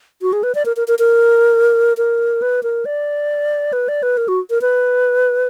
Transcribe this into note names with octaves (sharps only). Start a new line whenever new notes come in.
F#4
G#4
B4
D5
A#4
A#4
A#4
A#4
A#4
B4
A#4
D5
B4
D5
B4
A#4
F#4
A#4
B4